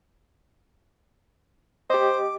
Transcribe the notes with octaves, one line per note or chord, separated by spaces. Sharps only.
G4 C5 D#5 D6